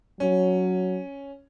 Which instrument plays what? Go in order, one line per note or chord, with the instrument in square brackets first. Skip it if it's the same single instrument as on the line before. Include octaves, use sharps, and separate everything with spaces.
[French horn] F#3 [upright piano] C#4